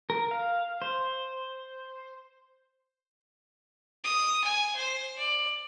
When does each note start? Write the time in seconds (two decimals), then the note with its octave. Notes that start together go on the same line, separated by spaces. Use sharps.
0.10 A#4
0.31 F5
0.82 C5
4.04 D#6
4.44 G#5
4.75 C5
5.18 D5